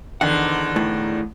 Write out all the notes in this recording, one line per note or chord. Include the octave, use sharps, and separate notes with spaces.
E2 D3 D#3 F#5
A2